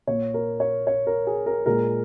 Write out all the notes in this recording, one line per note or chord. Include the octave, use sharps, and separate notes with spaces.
A#2 A#3 C#5
A#4
C#5
C#5
A#4
G#4
A#4
A#2 G#3 A#4